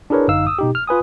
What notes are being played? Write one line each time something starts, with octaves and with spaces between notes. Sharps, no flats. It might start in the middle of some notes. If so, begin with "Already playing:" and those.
D4 E4 G#4 A#4 B4 C#5
G1 F#2 D3 D#4 F5 E6
D#6 E6
B2 D#4 G4
F6
F4 B4 G#5 D#6